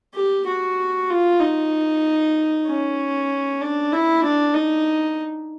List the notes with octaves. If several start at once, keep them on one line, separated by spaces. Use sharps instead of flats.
G4
F#4
F4
D#4
C#4
D4
E4
D4
D#4